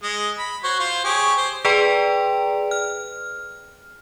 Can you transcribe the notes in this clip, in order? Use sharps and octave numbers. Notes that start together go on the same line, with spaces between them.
G#3 D#5
B5
F#4 C5 C#5
F4 C5
G4 G#4 C#5
C5
G#4 B4 D5 G5 A#5 C6
F6